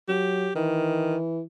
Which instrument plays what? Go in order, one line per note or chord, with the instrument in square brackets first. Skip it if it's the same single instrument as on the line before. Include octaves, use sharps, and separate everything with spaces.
[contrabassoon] F#3 [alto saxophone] G4
[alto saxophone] D#3 [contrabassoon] E3